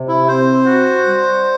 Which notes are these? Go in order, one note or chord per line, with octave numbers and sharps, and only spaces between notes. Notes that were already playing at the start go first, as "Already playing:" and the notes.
Already playing: C3
E4
C4 C5
F#4
G3